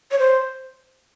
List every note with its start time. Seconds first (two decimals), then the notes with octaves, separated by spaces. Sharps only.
0.11 C#5
0.19 C5